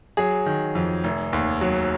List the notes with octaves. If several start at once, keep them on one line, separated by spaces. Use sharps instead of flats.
F#3 G#4
D#3
F2
F1
D#2
F#3